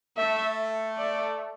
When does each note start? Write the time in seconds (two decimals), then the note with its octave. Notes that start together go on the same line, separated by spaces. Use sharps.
0.17 A3 E5
0.98 D5